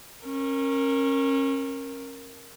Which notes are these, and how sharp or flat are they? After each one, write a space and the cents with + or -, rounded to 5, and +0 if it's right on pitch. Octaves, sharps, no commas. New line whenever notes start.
C#4 -30 A#4 +0